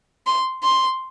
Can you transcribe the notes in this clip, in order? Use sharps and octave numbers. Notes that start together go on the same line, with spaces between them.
C6
C6